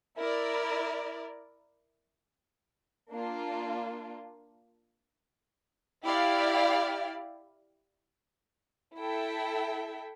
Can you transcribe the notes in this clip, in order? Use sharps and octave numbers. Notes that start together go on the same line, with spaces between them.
E4 A#4 D5
A#3 D4 F4
E4 G4 D5 F5
E4 A4 E5 G5